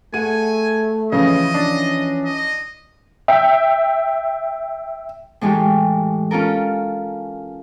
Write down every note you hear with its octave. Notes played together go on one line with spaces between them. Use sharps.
A3 G#4 F#5 G#5 D#7
C#3 E3 F3 E4 D#5
C#4 D4
D#5
E5 G5
A2 E3 G#3 A3 G4
C#4 F4 A4 A#4